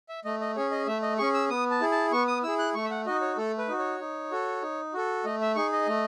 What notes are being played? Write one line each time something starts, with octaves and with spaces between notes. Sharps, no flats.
E5
A3 D#5
D#5
C#4 G#4 C#5
D#5
A3 E5
D#5
C#4 G#4 C#6
E6
B3 D#6
A5
E4 G#4
A5
B3 C#6
D#6
E4 G#4 E6
F#6
A3 C#6
E5
F#5
D#4 F#4 D#5
C#5
A3 A4
B4
D#4 F#4
C#5
D#4
F#4 A4
D#4
F#4 A4
A3 D#5
E5
D#4 G#4 C#6
D#5
A3